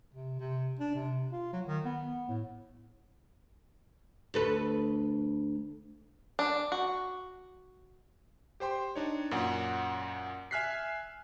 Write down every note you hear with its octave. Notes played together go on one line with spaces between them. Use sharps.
C3
C3
D4
C3
F4
F#3
D#3
B3
A2
D2 A4 B4
D4
F#4
G4 C5 G5 C6
D4 D#4 C#5
F#2 A#2 C#4 F#5
E5 G#5 F6 F#6 B6 C7